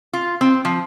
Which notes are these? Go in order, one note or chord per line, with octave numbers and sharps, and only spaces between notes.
F4
C4
F3